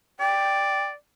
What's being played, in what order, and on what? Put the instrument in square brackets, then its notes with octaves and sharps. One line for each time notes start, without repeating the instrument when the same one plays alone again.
[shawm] D5 [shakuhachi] G5